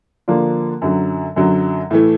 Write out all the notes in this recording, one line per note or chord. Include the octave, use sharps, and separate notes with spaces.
D3 F3 A#3 D4 F4
F#2 D3 F#3
F#2 D3 F#3
A2 E3 A3